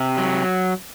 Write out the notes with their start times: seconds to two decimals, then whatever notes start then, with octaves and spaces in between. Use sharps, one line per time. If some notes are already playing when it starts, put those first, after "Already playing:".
Already playing: C3
0.17 F#3